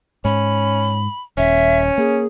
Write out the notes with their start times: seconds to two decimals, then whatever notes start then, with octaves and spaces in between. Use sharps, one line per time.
0.25 G#2 C#4 B5
1.37 D#1 C#4 E5
1.98 A#3 G#4